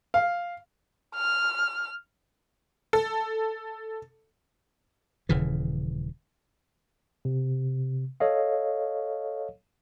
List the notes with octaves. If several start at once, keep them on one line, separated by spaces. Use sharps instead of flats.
F5
F6
A4
D#1 C#3 E3
C3
A4 C#5 D#5 F5